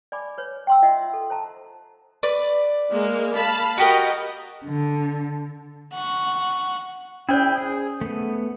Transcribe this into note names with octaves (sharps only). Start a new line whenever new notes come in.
D5 G#5 B5 D6
B4 C#5
G5 C6 E6
F4 D#5 E5 F#5
A4
C5 A5 A#5
B4 D5
G#3 A#3
F5 A5 B5
F#4 G4 A#4 D#5
D3
F#5 C#6
C#4 E4 G#4 C5 D5 G5
G#4
A3 B3